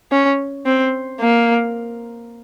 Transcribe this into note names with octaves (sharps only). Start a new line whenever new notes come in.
C#4
C4
A#3